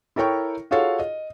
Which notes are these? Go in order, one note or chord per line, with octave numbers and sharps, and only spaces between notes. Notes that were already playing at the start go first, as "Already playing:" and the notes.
E4 A4 A#4 C#5 G5 C#6
F4 F#4 G#4 A4 C#5 F5
D#5